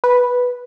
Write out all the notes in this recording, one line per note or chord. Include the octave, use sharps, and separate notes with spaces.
B4